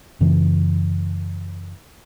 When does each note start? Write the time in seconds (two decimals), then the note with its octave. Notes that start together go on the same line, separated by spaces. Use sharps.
0.21 F#2 C#3 E3